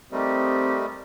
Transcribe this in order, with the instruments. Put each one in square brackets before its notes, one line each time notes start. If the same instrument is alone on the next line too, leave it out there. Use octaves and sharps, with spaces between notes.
[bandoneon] G3 A3 [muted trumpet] C4 [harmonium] D#4 A#4 D#5 [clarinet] G4